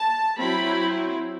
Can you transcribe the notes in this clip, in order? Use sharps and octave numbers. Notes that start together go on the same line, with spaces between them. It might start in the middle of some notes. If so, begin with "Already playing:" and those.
Already playing: A5
F#3 C4 E4 B5